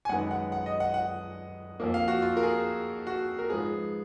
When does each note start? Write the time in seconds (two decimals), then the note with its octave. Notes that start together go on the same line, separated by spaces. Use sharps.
0.05 G#5
0.09 F#2 D#3 G#3 B3 F#5
0.31 F#5
0.52 F#5
0.66 D#5
0.80 F#5
0.94 F#5
1.80 F2 F3 A#3
1.94 F5
2.08 F#4
2.22 F4
2.37 A#4
2.43 G#4
3.07 F#4
3.39 A#4
3.50 G#2 F3 B3 G#4